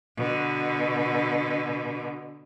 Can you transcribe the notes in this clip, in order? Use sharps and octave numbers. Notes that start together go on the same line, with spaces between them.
B2 D3